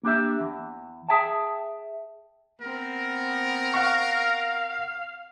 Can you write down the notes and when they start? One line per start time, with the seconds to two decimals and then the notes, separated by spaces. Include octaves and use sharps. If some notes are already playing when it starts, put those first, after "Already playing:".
0.03 A#3 D4 G4 E5
0.40 E2
1.08 G#4 E5 G5 A5
2.61 B3 C4 A#4
3.74 F5 F#5 C#6